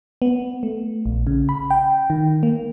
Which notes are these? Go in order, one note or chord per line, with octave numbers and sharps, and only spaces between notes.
B3
A3
A#1
C#3
B5
G5
D#3
A#3